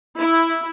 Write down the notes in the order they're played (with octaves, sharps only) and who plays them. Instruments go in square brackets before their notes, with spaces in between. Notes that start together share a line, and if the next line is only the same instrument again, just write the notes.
[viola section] E4